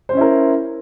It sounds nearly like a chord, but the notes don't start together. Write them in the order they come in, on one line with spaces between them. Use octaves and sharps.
C5 C#4 E4 A#4